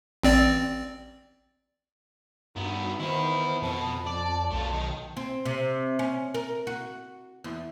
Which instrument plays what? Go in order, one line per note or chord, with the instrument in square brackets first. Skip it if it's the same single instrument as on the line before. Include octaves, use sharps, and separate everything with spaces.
[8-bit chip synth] A1 C4 D5
[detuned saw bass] G2 [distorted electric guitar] D#3 B3 [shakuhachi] F#4
[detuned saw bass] D#3 [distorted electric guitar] B3 E4 [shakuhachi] C5
[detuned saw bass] F2 [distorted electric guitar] B2 [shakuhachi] A5
[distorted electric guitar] D5
[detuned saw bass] B1 [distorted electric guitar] A3 F4
[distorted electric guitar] D#3
[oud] C4
C3
C#4
A#4
F#4
E2